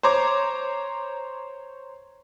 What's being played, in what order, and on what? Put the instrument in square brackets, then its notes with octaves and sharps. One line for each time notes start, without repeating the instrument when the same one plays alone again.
[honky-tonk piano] C5 C#5 A#5 D6